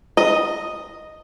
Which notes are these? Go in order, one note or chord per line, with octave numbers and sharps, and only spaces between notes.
D#5